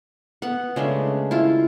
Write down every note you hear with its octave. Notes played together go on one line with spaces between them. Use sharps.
B3 F#5
C#3 G#3 A3 D4
E4 F4